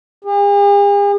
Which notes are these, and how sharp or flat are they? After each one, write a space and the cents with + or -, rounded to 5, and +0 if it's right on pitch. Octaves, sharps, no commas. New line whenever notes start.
G#4 -45